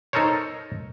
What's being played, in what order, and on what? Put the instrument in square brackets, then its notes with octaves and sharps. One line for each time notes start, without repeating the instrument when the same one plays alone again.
[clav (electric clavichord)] D#4 A4 A#4 C5 C#5